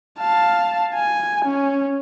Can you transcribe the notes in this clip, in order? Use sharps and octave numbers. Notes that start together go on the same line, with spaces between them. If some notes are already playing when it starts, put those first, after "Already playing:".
F5 A5
G#5
C#4